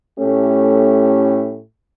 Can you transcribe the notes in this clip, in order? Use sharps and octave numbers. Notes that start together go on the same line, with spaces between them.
A2 A3 C#4 G4